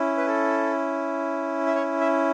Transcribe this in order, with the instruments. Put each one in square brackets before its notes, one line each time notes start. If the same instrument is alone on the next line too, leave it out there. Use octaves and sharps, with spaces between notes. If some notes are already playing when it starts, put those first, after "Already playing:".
Already playing: [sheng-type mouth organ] C#4 E4
B4
A4
E5
C#5
E5